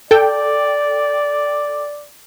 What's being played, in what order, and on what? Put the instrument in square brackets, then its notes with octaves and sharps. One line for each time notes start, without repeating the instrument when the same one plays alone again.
[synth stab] A4 G5 [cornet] D5